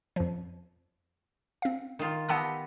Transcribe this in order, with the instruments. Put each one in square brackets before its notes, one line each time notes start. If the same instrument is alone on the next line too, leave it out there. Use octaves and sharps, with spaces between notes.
[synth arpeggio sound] F2 F3
C4 F5
[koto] D#3 F4
[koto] B3 G4 D#5 [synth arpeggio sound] F#5 A5 E6